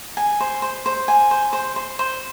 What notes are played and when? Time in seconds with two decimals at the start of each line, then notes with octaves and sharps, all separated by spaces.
0.17 G#5
0.40 C5
0.62 C5
0.86 C5
1.08 G#5
1.31 C5
1.53 C5
1.76 C5
1.99 C5